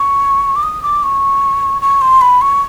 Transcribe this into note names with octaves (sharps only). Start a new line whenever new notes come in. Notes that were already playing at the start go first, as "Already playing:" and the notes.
Already playing: C#6
D6
D#6
D6
C#6
C#6
C6
B5
C#6